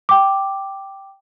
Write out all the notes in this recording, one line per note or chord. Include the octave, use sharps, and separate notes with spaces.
G5 D6